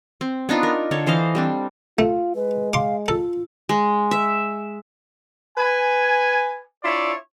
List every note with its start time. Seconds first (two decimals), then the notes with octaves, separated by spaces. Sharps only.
0.21 C4
0.49 B3 D4 D#4 F4
0.63 A#4
0.91 D3 A4 C#5
1.06 E3 C5 D#5 F5
1.35 G3 C4 D4
1.99 A3 F4
2.35 G#3 B4
2.73 F5 C6 D6
3.08 F4 A4
3.69 G#3
4.11 E5
5.58 B4 G#5
6.84 D4 E4 F4 C#5 D5 E5